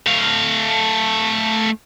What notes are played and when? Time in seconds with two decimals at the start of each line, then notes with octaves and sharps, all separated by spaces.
0.07 A3 F5